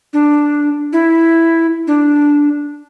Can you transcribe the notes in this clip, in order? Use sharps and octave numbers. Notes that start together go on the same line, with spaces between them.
D4
E4
D4